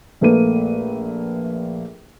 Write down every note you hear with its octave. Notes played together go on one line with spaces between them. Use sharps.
A#1 A3 A#3 B4 D#7